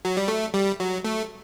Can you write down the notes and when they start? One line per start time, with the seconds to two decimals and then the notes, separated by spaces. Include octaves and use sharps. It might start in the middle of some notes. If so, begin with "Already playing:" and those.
0.05 F#3
0.17 G3
0.28 A3
0.54 G3
0.80 F#3
1.05 A3